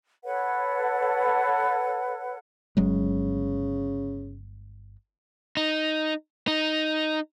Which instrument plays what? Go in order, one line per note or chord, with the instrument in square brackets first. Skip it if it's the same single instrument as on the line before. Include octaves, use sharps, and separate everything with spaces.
[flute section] A4 B4 C#5 F#5
[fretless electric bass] G1 F#3 G#3 [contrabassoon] C#3
[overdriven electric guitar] D#4
D#4